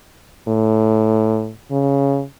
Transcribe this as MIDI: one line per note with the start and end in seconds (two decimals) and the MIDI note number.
0.48 1.51 45
1.71 2.22 49